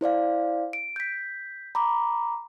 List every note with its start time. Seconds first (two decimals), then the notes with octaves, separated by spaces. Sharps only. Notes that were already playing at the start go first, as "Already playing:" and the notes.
0.01 E4 C5 D5 F5
0.73 D7
0.96 G6 B6
1.75 A#5 B5 D6